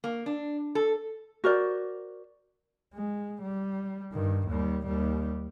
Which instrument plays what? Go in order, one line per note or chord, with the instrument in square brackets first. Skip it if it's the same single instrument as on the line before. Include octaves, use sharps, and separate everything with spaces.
[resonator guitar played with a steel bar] A#3
D4
A4
[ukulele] F#4 A#4 C5 D5
[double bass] G#3
G3
G2 D#3
D#2 G3
D#2 G3